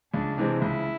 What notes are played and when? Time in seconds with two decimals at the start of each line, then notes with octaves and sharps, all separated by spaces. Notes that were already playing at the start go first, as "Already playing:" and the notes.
0.13 C#2 D4
0.38 C3 E3 G#3 C4
0.62 C#2 E4